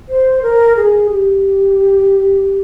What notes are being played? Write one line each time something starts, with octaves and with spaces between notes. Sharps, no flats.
C5
A#4
G#4
G4